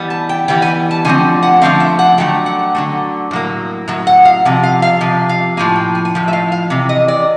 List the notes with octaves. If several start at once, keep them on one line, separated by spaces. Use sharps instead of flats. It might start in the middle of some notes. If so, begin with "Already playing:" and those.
Already playing: E3 G3 B3
A5
G5
E3 G3 B3 G5
G#5
A5
D3 F3 A3 C4 G#5
F#5
D3 F3 A3 C4 F5
E5
F#5
D3 F#3 A3 G5
F#5
D3 F#3 A3
A2 F#3 A#3
A2 F#3
F#5
F5
C3 F3
F5
F5
C3 F3
F5
A2 F3 A#3 G#5
G5
G#5
G#5
A2 F3
E5
F5
F5
C3 E3
D#5
D5